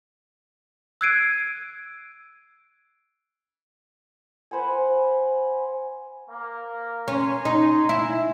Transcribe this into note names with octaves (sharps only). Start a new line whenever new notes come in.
E6 F#6 G#6 C7 D7 D#7
B4 C5 F#5 G#5
A#3
C#4 G#5 A#5 C6
D#4
E4